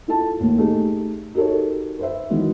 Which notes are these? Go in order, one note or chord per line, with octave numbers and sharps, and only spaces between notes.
E4 F4 A4 A5
D#2 A2
A3 D#4 G4 G#4
D#4 F#4 G4 A4 A#4 C#5
B4 C5 E5
D#3 E3 F#3 G#3 B3 D#4